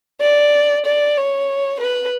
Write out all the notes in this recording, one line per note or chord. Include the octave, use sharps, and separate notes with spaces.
D5
D5
C#5
B4